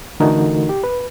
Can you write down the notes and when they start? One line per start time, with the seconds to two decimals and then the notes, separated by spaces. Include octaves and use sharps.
0.20 D3 E3 A3 D#4 F#4 A#4
0.69 G4
0.84 B4